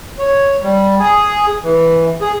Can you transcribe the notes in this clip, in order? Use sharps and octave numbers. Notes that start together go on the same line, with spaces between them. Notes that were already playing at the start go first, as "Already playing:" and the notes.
C#5
G3
G#4
E3
G#4